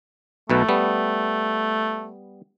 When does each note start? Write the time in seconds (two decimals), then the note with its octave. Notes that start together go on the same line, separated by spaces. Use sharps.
0.50 B1 B2 A3 B4
0.69 G3 B3